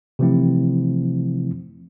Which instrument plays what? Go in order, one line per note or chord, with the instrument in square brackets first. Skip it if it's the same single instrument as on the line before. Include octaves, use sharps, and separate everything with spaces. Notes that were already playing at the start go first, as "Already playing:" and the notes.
[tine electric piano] C3 E3 F3 A3 C4 E4